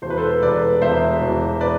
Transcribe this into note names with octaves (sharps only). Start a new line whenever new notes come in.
E1 C5
B4
A4 C5
E1 B4 D5
E1 C5 E5
E1
B4 D5